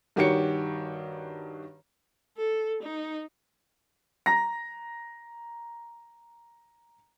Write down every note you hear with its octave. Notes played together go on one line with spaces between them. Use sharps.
G2 D#3 F#4 G4 C#5 C#7
A4
D#4
A#5 A#6